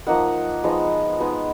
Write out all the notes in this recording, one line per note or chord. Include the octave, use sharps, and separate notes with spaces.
F3 A#3 D#4 F#5
F3 G#3 B3 D#4
G#3 B3 D#4